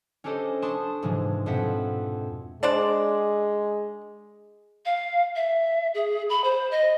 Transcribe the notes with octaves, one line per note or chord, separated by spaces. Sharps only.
C#4 D4 G4 A4 C5 D#5
D4 A5 C6 C#6 D#6 E7
G#2 C3 E3 F3 G#3
F2 B2 C4 E5 F#5 B6
G#3 D4 C5 D5
F5
E5
G#4
B5
C5
D#5